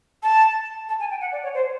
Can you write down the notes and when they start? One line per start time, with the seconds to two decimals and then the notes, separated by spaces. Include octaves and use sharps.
0.23 A5
0.89 A5
1.00 G#5
1.11 G5
1.21 F#5
1.32 D5
1.43 C#5
1.54 C5